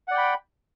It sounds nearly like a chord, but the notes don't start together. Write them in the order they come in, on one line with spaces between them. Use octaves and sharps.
F#5 D5 G5 B5